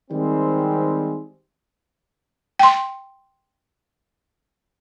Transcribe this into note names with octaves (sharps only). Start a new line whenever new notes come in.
D#3 G3 G#3 C4
G5 C6